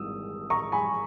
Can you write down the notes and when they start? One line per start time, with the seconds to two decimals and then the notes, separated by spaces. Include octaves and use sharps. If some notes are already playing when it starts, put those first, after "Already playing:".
Already playing: G#1 E3 G3 D#6 E6
0.50 A#5 C#6
0.72 G#5 B5